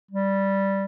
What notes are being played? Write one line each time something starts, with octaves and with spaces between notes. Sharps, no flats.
G3